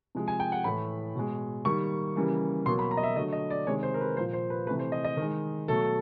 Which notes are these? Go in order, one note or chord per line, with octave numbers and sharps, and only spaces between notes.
C3 F3 G#3
G#5
G5
F#5
A2 E3 A3 B5
B2 G#3
D#3 G3 A#3 C#6
C#3 E3 G3 A#3
B2 F#3 A#3 C6
B5
A#5
D#5
E5
D3 F#3 A3 D#5
D#5
D5
C3 D#3 G#3 C#5
C5
A#4
B4
A#2 F3 A#3 C5
C5
B4
C3 E3 A3 B4
C5
D#5
D#5
D#3 G#3
B2 F#3 A3 A4